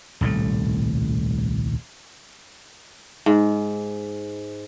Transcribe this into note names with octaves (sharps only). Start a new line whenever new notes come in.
D#1 C2 A2 A3
G#2